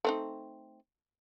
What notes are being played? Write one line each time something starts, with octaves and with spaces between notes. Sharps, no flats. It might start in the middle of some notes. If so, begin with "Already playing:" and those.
A3 C4 D#4